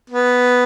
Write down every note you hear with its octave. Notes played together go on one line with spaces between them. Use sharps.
B3